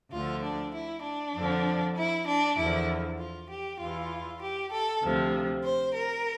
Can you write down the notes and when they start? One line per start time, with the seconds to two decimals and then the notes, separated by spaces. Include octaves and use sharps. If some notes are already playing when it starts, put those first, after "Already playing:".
0.11 D2 D3 F3 F4
0.43 D4
0.73 E4
1.04 D4
1.34 F2 D3 F3
1.96 E4
2.26 D4
2.58 E2 D3 F3 E4
3.19 F4
3.49 G4
3.79 E2 E3 F4
4.41 G4
4.72 A4
5.03 D2 C3 F3
5.63 C5
5.94 A#4